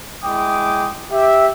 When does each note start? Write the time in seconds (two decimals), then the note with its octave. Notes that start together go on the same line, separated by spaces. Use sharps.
0.25 G#3 E4 G5 D6 D#6
1.12 G4 E5